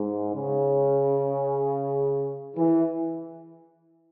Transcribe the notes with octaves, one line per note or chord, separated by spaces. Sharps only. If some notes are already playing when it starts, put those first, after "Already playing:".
Already playing: G#2
C#3
E3